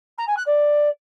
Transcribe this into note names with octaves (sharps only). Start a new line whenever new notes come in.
A#5
G#5
F#6
D5